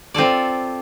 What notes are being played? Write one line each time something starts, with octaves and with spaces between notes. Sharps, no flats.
C4 F4 A4 D5